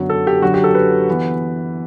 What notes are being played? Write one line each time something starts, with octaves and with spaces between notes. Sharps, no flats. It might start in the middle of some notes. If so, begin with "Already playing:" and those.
Already playing: F#2 D3 F#3 B3
A4
G4
F#2 D3 F#3 F#4
G4
A4
B4
E3 B3